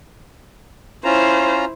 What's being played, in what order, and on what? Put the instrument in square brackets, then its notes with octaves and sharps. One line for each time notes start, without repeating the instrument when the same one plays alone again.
[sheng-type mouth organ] C#4 F4 A#5 [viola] E4 C5